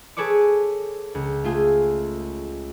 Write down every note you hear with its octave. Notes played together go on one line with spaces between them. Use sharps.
G#4 A4 B4 C#5 D6
C#2
A3 F4 G#4